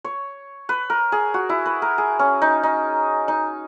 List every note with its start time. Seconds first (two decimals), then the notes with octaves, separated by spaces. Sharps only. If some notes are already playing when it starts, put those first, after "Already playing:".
0.05 C#5
0.69 B4
0.90 A#4
1.12 G#4
1.34 F#4
1.49 E4
1.66 B4
1.82 A#4
1.98 G#4
2.19 C#4
2.42 D#4
2.63 D#4
3.28 D#4